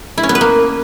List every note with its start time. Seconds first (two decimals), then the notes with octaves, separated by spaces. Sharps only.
0.18 E4
0.23 C#4
0.29 B3
0.35 B4
0.41 A#3